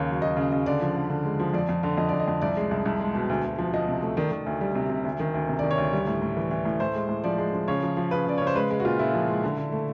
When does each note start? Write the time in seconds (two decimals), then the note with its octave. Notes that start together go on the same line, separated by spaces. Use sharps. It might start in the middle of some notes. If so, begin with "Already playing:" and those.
Already playing: D#2 C#3 C#5
0.08 F#3
0.22 F#3 D#5
0.37 C#3
0.52 C#3 D#5
0.66 D3 D5
0.81 F3
0.96 D3
1.10 D3
1.25 G#3
1.40 F3
1.54 F2 D5
1.69 F2
1.83 D3
1.97 F2 D#5
2.09 F2 D5
2.20 D#5
2.28 F2
2.42 C2 D5
2.57 G#3
2.71 C2
2.85 C2
3.00 G#3
3.15 B2
3.29 D2
3.44 D2
3.58 F3
3.74 F3 D#5
3.88 C3
4.02 A3
4.17 D#3 D5
4.31 D#3
4.46 D2
4.61 G3
4.75 C3
4.90 C3
5.04 D2
5.19 D#3
5.34 D2
5.49 C3
5.59 D#3 D5
5.71 C#5
5.78 D2
5.93 G3
6.07 A2
6.22 A2
6.37 E3
6.51 E3
6.65 A2
6.80 A2 C5
6.95 G#3
7.09 A2
7.24 F3 D5
7.38 G#3
7.54 F3
7.68 C#3 C#5
7.83 F3
7.97 F3
8.11 C#3 B4
8.27 C#3 D5
8.38 C#3 C#5
8.47 C5
8.55 G#3 B4
8.71 G#3
8.80 F#4
8.85 A#2 F4
8.99 A#2 E4
9.14 F3
9.28 G#3
9.43 D3
9.57 D3
9.72 A3